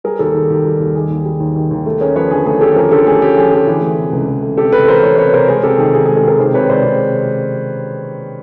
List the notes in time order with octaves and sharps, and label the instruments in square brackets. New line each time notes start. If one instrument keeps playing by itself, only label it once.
[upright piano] G3 [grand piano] G#4 A#4
[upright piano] D#2 [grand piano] G4 A4
[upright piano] D#3 [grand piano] G#4
[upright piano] D#2 [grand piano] G4
[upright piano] G3
D#2
[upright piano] D#3 [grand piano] G#4
[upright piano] D#2
G3
D#2
D#3
D#2
A3
[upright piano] C#4 [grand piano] G#4 A#4
[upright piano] F3 [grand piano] B4 C#5
[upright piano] D3 [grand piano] G#4
[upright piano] A3 [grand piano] G#4
[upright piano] C#4 [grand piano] G4 A4
[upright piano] F3 [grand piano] G#4 A#4
[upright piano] D3 [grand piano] G4 A4
[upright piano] A3 [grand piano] G#4
[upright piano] C#4 [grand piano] G4
[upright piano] F3 [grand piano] G#4
[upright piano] D3 [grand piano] G#4
[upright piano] E3
A3
C3
C#2
E3
A3
[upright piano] C3 [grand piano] G4 A4
[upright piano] C#2 [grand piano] A4 B4
[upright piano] E3 [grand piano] A#4 C5
[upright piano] A3 [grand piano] B4 C#5
[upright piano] C3 [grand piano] B4 C#5
[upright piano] C#2 [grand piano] A#4 C5
[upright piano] G#3 [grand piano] G#4 A#4
[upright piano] C3 [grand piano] G4 A4
[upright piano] D#3 [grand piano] G#4
[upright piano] C3 [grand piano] G#4
[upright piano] G#3 [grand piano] G#4
[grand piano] G4 A4
[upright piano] C3 [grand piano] G#4 A#4
[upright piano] D#3 [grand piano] A#4 C5
[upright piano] C3 [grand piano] B4 C#5
[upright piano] G#3 [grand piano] C5 D5
[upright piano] C3